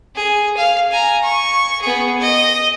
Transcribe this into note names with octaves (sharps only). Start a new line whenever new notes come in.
G#4
F5
G#5 A#5
C#6
B3 G#4
D#5